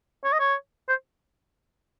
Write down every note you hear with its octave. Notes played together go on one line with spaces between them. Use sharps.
C#5
D#5
C#5
C5